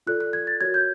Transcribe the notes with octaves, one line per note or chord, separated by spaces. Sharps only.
F4 A4 D5 F#6
F#6
G#6
A6
F#4 A#4 C#5 G#6
G6